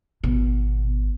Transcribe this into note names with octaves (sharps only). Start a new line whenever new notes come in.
G#1 B2